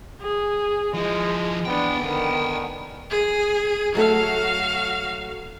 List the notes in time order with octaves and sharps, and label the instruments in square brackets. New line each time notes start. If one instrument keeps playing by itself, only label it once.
[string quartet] G#4
[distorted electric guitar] F3 E4 [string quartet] G#3
[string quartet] B3 D4 [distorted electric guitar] F#5 G5
[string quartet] D3 D#3 B3
[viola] G#4
[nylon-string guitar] F#3 A3 A4 [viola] F#4 F5